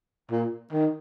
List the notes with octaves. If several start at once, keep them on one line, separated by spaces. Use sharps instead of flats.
A#2
D#3